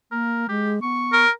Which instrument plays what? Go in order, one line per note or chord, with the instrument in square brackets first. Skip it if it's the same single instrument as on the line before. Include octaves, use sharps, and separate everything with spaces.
[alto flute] A#3 [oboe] A#4
[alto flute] G#3 [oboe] G4
[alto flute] B3 [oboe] C#6
[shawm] A#4